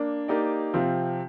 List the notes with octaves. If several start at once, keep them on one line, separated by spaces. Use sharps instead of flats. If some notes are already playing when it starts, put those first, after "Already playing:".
Already playing: A#3 D4
A#3 D#4 G4 D5
C3 F3 C4 F4